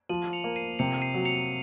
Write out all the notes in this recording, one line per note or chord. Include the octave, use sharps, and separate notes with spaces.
F3 D#7 F#7
C#7 F7
A#3
C7 D#7
C3 C#7 F7
C7 D#7
F#3
C#7 F7